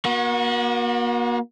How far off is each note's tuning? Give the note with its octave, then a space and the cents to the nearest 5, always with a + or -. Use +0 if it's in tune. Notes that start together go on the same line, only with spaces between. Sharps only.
A#3 +40 F#4 -20